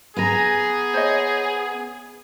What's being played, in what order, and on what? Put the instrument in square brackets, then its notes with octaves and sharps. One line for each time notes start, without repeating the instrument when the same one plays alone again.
[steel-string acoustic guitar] B3 G#5 A#5 [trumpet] G#4
[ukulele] C5 C#5 D#5